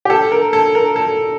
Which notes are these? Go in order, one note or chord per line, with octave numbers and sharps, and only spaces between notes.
G4
A4
A#4
A4
A#4
A4